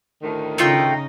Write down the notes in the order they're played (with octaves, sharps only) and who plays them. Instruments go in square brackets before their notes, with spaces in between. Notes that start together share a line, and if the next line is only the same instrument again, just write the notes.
[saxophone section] D2 A2 D#3
[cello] C#3 D#4 [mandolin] A3 F4 G5